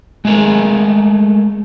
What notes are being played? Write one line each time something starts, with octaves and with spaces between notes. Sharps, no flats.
G#3 A3 G#4 A#4